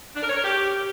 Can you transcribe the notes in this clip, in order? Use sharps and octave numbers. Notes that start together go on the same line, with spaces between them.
D4
A#4
C#5
A#4
G4